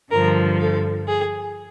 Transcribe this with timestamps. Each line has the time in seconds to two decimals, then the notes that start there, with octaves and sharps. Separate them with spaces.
0.11 G2 D3 F3 A#4
0.59 A4
1.08 G#4